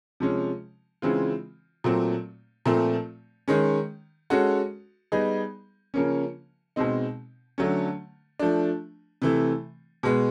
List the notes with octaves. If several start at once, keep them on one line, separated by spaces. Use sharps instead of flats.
C3 F3 G#3 C#4
C#3 E3 G#3 C4 F4
A#2 F#3 A3 C4
A#2 F3 A3 C4
D#3 G#3 C#4
G#3 C#4 F#4 A4
G3 B3 D#4 G#4
C#3 F3 A#3 C#4
B2 G#3 C4 D#4
D3 F#3 A3 C#4
F3 A3 D4
C3 E3 A3
B2 G#3 B3